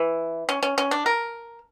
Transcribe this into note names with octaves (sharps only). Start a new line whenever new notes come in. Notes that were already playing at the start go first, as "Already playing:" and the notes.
Already playing: E3
C#4
C#4
C#4
D4
A#4